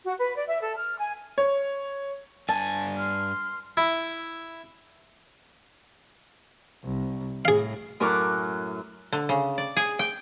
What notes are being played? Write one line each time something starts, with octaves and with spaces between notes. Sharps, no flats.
F#4
B4
D5
E5
A4
F6
G#5
C#5
G2 G#5 A5
C6 F6
E4
C2
A2 G#4 F5
F#2 A2 A#4 C#6 D6 F#6
D3
C#3
D5
G#4
G5